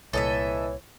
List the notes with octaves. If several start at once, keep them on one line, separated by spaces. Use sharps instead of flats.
C2 A#2 E3 A4 C#5 D#5 E5